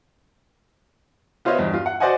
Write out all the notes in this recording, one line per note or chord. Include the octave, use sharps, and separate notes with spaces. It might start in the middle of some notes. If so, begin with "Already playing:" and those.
B3 F4 C5 C#5 D#5 E5
E2 G2
F4
F#5
F#4 C5 D5 D#5 F#5 G#5